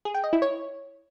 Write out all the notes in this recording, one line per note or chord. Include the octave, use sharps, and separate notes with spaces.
G#4
G5
D#5
E4
C#5